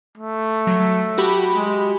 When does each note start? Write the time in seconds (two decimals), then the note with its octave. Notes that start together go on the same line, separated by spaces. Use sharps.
0.18 A3
0.67 F#3
1.18 F#4 G4 B5
1.54 G#3